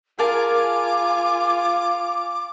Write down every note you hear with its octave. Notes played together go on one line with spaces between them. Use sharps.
F4 G#4 A#4 G#5 A5 D6